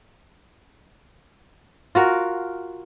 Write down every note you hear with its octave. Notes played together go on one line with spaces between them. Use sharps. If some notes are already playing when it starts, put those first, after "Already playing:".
F4 F#4 A#4